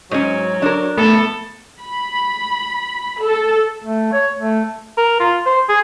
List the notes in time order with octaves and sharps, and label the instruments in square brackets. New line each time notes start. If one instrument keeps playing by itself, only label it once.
[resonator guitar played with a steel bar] G#2 C#4 [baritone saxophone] F#3
[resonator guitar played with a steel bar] D4 A#4
[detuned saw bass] A3 [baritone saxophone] B3 [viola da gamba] A4
[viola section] B5
A4
[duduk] A3
C#5
A3
[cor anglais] A#4
F4
C5
G#4